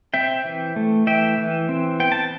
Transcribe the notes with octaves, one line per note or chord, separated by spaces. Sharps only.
C4 E5 G5
E3
A3
E3 E5 G5
E3
C4
B3 G5
A5